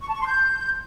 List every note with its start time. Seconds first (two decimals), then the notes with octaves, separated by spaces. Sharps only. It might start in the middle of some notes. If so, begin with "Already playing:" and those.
0.03 C#6
0.09 A5
0.15 C#6
0.21 C6
0.27 G6